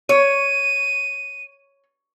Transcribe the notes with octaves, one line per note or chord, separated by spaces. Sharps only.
C#5 D#7